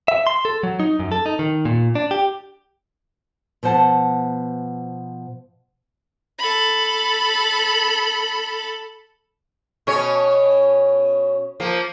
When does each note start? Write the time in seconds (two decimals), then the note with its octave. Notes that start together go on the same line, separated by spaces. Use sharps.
0.08 E5
0.27 C6
0.45 A4
0.63 F#3
0.80 D#4
0.99 F#2
1.12 A4
1.26 D#4
1.39 D#3
1.65 A#2
1.95 D4
2.11 G4
3.63 B2 F3 C5 F#5 A5
6.39 A4 B5
9.87 B2 C#4 C#5
11.60 F3 A#3